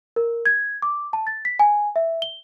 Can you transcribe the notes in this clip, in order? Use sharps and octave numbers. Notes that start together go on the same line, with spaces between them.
A#4
G#6
D6
A5
A6
B6
G#5
E5
G7